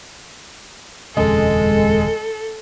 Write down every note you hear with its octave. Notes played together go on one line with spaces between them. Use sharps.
D#1 F2 C#3 G#3 A4